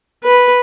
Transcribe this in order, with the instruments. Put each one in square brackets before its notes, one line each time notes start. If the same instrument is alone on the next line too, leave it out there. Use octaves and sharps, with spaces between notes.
[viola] B4